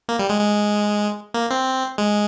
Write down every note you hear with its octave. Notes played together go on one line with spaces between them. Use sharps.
A#3
G3
G#3
G#3
A#3
C4
G#3